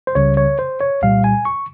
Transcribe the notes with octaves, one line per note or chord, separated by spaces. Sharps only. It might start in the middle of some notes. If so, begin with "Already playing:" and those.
C5
C#2 C#3 G3 C#5
C#5
C5
C#5
C2 A#2 G3 F5
G#5
C#6